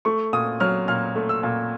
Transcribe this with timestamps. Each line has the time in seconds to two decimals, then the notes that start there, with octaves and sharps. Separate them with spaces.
0.05 A3 C#6
0.33 A#2 D#6
0.60 F#3 F6
0.88 A#2 F6
1.16 A3
1.29 E6
1.43 A#2